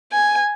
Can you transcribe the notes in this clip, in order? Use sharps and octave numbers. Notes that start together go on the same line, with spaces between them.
G#5